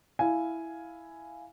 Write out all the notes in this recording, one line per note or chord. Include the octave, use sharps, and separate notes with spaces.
E4 F5 G#5